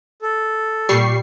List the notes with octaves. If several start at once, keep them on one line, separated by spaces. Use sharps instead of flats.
A4
A#2 G3 C#6 C7